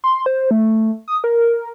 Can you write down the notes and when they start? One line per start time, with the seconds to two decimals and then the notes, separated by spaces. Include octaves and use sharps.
0.04 C6
0.26 C5
0.51 A3
1.08 D#6
1.24 A#4